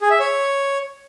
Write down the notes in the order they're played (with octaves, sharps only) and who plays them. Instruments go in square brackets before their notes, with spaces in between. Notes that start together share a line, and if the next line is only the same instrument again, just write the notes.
[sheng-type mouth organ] G#4
E5
C#5